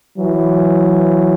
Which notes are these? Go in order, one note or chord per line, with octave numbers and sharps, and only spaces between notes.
E3 F#3